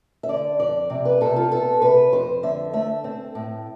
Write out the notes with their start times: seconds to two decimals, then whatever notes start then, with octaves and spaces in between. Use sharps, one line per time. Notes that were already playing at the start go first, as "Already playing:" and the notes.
0.23 E5
0.29 D3 D5
0.60 F2 D5
0.90 C3
1.05 B4
1.21 C3 A4
1.36 F4
1.51 B3 A4
1.82 C3 B4
2.13 F2 C5
2.43 D3 E5
2.73 A3 E5
3.04 C4
3.35 A2